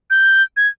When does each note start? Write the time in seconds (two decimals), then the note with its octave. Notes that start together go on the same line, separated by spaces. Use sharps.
0.10 G6
0.57 G#6